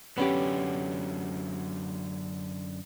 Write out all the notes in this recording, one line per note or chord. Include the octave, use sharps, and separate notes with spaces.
F#2 D3 B3 C#4 G4